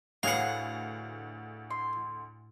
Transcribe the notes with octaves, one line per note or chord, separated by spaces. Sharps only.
D2 A2 F#4 G#4 B4 F5 F#5
C6